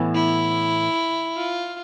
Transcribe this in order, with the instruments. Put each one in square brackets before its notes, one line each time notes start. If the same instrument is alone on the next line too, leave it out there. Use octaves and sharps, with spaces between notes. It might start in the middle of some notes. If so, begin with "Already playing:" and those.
Already playing: [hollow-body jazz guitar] A2 E3 B3
[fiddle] E4
F4